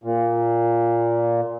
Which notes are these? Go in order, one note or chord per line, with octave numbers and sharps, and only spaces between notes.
A#2